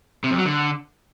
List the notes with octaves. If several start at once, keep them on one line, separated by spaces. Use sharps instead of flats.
C3
F2
F#3
D3